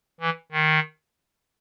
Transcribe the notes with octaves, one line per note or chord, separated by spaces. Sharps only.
E3
D#3